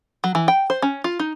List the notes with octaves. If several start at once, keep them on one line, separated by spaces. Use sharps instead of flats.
F#3
E3
G5
C5
C#4
F4
D#4